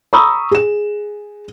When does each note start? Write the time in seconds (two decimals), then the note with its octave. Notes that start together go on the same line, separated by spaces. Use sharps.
0.13 A#5 B5 C#6 D#6 E6
0.51 G#4 E7